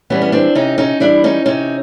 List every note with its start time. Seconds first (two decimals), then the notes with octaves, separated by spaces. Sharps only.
0.10 E3 G3 B3 C#4
0.22 C#4
0.32 C4 D4
0.55 C3 C#4 D#4
0.78 C#4 D#4
1.00 E3 G3 D4 E4
1.24 C#4 D#4
1.46 C3 C#4 D#4